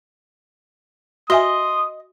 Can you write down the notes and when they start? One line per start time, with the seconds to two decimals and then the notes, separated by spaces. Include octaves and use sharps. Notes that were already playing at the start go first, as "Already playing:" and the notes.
1.30 F#4 D#5 E5 G#5 C6 D#6